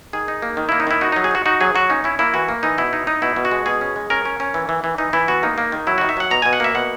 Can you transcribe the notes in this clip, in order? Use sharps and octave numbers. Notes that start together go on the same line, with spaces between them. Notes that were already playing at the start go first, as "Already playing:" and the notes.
D#3 G#4
D#4
A#3
D#3
A#3 E4
D#4
D#3 E4
D#4 F#4
F#3 D#4
G#4
D#4 F#4
D#4 F#4
F#3 G#4
F#3 F#4
C#4 D#4
C#4 E4
A#3 E4
E3 F#4
A#3
E3 D#4
B2 E4
D#4
D#4
B2 E4
B2
F#4
G#3
B2 G#4
C#4
G#3
C#4 A#4
C#4
C#4
E3
E3
E3
E3 D#4
E3 E4
B3 F#4
A#3 D#4
A#3
D#3
F#3 E4
D#3 F#4
E5
F#3 F#5
B2 A#5
B2 G#5
F#5
A#3 E5
B2 F#5